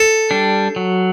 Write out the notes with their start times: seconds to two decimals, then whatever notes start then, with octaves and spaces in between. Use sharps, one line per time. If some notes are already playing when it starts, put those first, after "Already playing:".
Already playing: A4
0.31 G3 D4
0.76 F#3